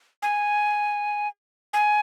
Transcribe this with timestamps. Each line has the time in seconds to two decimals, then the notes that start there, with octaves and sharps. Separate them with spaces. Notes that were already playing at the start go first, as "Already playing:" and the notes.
0.22 G#5
1.73 G#5